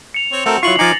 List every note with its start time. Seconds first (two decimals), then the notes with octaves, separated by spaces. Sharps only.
0.14 C#7 F7
0.32 C4 C#5
0.46 A3 C4 F#4 A4 A#4
0.63 F#3 E4 F4 C#6 C7 F#7
0.79 F3 D#4 G#5 D6 A6 A#6 C#7